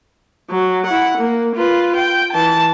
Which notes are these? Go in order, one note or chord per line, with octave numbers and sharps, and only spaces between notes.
F#3
E4 F#5
A#3
F4 B4
G5
E3 A5